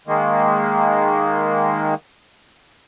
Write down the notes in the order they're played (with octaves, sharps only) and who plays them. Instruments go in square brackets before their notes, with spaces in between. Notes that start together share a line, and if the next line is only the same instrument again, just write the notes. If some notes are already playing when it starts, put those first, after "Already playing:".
[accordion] D#3 G#3 A#3